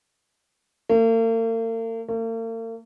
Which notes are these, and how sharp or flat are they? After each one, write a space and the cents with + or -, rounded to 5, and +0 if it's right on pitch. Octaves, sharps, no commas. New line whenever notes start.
A#3 -45
A#3 -45